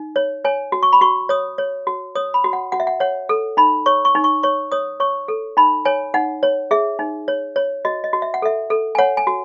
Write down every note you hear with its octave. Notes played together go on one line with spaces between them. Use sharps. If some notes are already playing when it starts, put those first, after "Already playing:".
Already playing: D#4
C#5
C#5 G#5
F#4
C#6
B5
F#4 C#6
C#5 D#6
C#5
F#4
C#5 D#6
B5
F#4
F#5
F#4 F#5
E5
F#5
C#5 F#5
A4
D#4 B5
C#5 C#6
C#6
D#4
C#6
C#5 C#6
C#5 D#6
C#5 C#6
A4
D#4 B5
C#5 G#5
D#4 F#5
C#5
G#4 E5
D#4
C#5
C#5
F#4 D#5
D#5
F#4
E5
F#5
A4 E5
A4
G#5
C#5 F#5
G#5
F#4